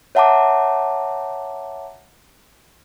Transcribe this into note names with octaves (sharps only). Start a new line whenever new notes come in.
C#5 E5 F#5 A5 A#5 D6